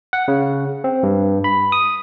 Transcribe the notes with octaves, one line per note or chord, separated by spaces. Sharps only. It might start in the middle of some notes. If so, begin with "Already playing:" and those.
F#5
C#3
C4
G2
B5
D#6